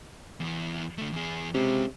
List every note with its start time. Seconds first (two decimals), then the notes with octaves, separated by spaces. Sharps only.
0.40 E2 E3
0.98 D3 A3
1.12 E2 G#4
1.54 C3 G#3 C#4